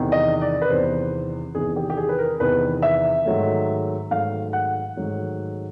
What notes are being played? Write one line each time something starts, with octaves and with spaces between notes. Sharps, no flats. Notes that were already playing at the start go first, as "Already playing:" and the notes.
Already playing: E2 C3 D#3
D#5
D5
B4
E2 C3 D#3 C5
E2 C3 D#3 G#4
G4
G4
G#4
B4
A#4
E2 C3 D#3 B4
E5
G#2 D#3 F#3 A3
G#2 D#3 F#3 A3 F5
F#5
G#2 D#3 F#3 A3